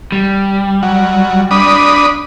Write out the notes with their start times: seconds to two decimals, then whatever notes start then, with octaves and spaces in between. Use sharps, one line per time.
0.12 G3
0.83 F#3
1.51 D4 B5 D#6